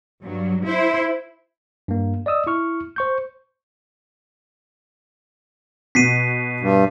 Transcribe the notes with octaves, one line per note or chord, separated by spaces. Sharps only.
G2 F#3
E4 C5
G2 A#3
D5 D#5 D#6 E6
E4 C#6 F6
C5 C#6 G6
B2 B6 C7 D#7
G2